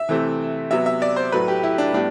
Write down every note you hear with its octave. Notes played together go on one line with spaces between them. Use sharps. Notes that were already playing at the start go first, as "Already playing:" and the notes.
Already playing: E5
C3 E3 A3 C4
C3 F#3 B3 E5
E5
D5
C5
A2 F#3 A3 B4
G4
E4
D4
A2 G3 B3 D4